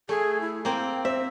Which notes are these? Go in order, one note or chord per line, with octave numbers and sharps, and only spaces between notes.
A3 G#4
E4
A#3 C4 G5
C4 E5